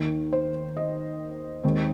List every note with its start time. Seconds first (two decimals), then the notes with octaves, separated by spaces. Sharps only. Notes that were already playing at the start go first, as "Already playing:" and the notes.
Already playing: D#2 D#3 A#3
0.33 C5
0.77 D#5
1.63 D#2 D#3 G#3 C4